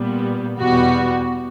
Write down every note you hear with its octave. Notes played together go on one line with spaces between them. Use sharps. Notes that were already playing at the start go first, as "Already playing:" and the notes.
Already playing: A#2 G3 B3
E2 B2 G3 B3 F#4